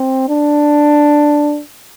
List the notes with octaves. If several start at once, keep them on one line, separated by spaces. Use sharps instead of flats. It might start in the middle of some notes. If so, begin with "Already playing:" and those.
Already playing: C4
D4